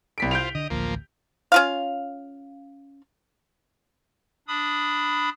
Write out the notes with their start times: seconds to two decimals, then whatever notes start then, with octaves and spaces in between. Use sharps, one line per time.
0.18 C2 B6 D7
0.31 F4 C5 G6 D7 F7
0.55 D3 D#5
0.70 A1 D2 F3 A#3
1.52 C#4 F4 F5
4.48 D4 B5 D#6